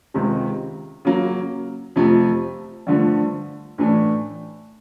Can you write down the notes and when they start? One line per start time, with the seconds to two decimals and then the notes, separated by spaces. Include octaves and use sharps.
0.14 C#2 C3 D#3 G#3
1.05 C#3 F#3 A#3
1.96 F2 C3 F3 A3
2.87 G2 D3 F3 A3
3.78 A2 E3 A3 D4